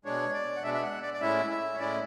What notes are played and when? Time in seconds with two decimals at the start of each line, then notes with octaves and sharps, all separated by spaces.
0.05 B2 G#3 D4 C#5
0.34 D5
0.56 F#5
0.63 B2 G#3 D4 E5
0.74 E5
0.82 F#5
1.02 D5
1.14 D5
1.20 A2 G#3 C#4 E4 E5
1.50 E5
1.74 C#5
1.79 A2 G#3 C#4 E4 D5